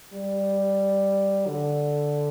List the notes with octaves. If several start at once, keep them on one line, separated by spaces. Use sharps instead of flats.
G3
D3